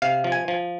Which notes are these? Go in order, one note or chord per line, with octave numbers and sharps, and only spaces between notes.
C3 F5
F3
G#5
F3